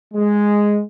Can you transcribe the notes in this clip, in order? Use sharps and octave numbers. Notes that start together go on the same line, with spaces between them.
G#3